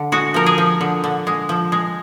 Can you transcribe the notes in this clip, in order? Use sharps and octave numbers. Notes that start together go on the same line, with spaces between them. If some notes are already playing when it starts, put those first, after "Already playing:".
Already playing: D3
G#3 F#4
F3 A#4
G#4
F3
D3
D3
G#3
F3
G#3